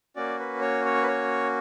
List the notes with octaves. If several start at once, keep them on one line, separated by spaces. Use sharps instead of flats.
A#3 C#4 F#4 D5
B4
C#5
C#5
B4
C#5